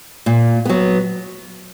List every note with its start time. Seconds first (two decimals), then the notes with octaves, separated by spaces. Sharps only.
0.26 A#2
0.65 F#3 B3